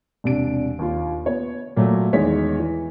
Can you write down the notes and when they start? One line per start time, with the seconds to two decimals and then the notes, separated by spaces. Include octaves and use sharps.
0.24 E1 C3 D4 D7
0.79 D#2 F4
1.26 B3 C#5
1.76 A#2 F#3 A3
2.13 E2 D#3 G#3 C#5 B6
2.60 E3